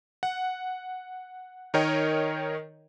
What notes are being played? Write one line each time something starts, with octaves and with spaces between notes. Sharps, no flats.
F#5
D#3 D#4 A#4 C#5 D#5 G5